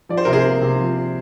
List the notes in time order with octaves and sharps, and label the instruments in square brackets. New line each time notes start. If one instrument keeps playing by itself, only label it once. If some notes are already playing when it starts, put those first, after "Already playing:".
[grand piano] F3 [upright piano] D5
[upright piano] C5
[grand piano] C3 [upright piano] A#4
[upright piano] G#4 C5
[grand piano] A#3
C3
F3